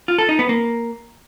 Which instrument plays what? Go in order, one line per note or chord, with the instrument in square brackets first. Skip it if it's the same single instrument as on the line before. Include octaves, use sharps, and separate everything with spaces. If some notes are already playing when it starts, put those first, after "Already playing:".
[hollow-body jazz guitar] F4
A4
D#4
B3
A#3